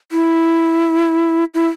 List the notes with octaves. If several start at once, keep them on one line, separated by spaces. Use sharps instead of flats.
E4
E4